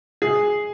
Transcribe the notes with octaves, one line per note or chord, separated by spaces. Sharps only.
G#4